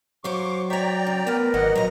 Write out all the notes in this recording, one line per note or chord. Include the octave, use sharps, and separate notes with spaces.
F#2 F#3 C5 F5 C#6 D6
C#5 D5 E5 G5 A#5
C#3
A3 B3 A#4 B4
G#1 A#2 F#3 A#3 D#5 F#5
A#2 F#3 D#5 A#5